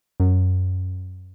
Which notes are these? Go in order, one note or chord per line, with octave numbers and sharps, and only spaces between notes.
F#2